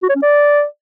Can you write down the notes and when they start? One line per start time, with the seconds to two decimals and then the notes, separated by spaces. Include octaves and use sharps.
0.03 F#4
0.09 C#5
0.16 C#4
0.22 D5